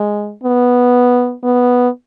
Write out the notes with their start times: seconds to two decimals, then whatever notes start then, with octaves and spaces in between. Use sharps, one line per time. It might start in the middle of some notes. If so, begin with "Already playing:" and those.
Already playing: G#3
0.43 B3
1.43 B3